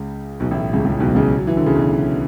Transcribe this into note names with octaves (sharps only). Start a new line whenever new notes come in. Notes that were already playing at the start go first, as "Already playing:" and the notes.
Already playing: C#2 C#3
B1 B2
A1 A2
C#2 C#3
C#2 C#3
B1 B2
C#2 C#3
F#3
E3
D3
C#3
B1 B2